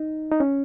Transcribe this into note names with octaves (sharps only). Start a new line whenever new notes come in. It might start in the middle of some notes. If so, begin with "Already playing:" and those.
Already playing: D#4
D#4
C#4